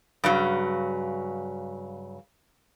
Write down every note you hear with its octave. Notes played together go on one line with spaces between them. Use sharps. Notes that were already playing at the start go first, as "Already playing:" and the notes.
G2 C#3 F#3